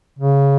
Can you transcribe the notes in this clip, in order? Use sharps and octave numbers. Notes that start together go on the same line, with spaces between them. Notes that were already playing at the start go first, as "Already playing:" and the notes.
C#3